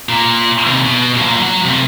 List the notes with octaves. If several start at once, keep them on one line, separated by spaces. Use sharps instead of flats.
A#2
D#2 C3
B2
A#2 F#3
F#3 F#5
C3 A3